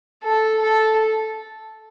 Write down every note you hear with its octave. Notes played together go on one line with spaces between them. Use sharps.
A4
A4